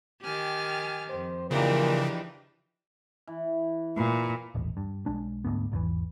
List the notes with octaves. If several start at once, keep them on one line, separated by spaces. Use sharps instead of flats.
D#3 G4 G#5 F6 A6
F2 C5
A#2 C#3 E3 F3 D4 D#4 G4
E3
A#2 B4
D#1 A1
G2
B1 G#3 D4
D2 G#2 B3
G#1 E2 D3 E3